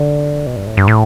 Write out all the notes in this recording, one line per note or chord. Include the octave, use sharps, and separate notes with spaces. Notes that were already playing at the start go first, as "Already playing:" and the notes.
Already playing: D3
B2
G2
A2
G2
A2